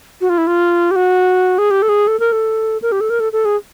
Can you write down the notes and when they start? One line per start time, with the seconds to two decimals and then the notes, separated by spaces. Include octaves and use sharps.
0.21 F#4
0.29 F4
0.38 E4
0.47 F4
0.91 G4
0.96 F#4
1.58 G#4
1.71 G4
1.82 A4
1.89 G#4
2.07 A4
2.20 A#4
2.32 A4
2.82 A#4
2.92 G4
3.01 A4
3.10 A#4
3.20 A4
3.33 A4
3.45 G#4